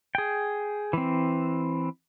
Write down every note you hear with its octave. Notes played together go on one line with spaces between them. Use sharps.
G#4 G5
E3 C4